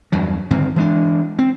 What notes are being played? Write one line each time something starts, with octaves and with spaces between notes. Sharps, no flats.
E2 G2 F#3
G2 D3 D#3 C4
E3 G#3 D4
C4